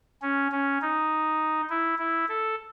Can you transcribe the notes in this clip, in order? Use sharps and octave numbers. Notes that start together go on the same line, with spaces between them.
C#4
C#4
D#4
E4
E4
A4